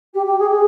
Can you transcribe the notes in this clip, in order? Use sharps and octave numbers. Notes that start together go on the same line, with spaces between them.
G4
G4
G#4
G#4